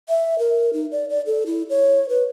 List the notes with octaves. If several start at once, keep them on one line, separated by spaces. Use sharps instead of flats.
E5
A#4
D#4
D5
D5
A4
E4
C#5
B4